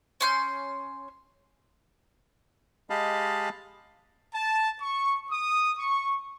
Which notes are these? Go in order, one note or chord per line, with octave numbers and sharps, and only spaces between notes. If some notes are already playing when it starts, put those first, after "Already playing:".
C#4 C6 G6
G#3 G4 D#5 F5 A5 B5
A5
C#6
D#6
C#6